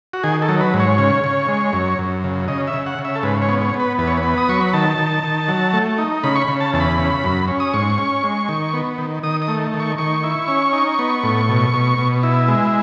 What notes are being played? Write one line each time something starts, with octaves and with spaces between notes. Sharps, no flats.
F#4
D#3 G#4
A4
F#3
B4
G#2
C#5
C#3
C#3
G#3
F#2
F#2
C#3
C#3 D#5
E5
C#3
F#5
C#3
E5
A4
G#2 B4
C#5
B3
C#5
B3
B4
E2 B4
C#5
B4
B3
D#6
F#3 C#6
B5
D#3 A5
D#3
D#3
F#3
A3
D#4
C#3 B5
C#6
B5
C#3
A5
E2 A5
B5
C#3
F#2
C#4
D#6
G#2 C#6
C#4
G#3
D#3
B3
D#3
D#3 D#6
D#6
A3
D#3
C#6
D#3 C#6
E4
C#4
D#4
B3
A2
B2
B2
B2
E4
G#3